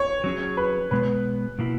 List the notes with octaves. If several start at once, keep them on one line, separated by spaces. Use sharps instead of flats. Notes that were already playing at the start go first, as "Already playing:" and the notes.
Already playing: C#5
F#3 C#4 G#4
B4
B2 G#3 B3 B4
B2 A#3 E4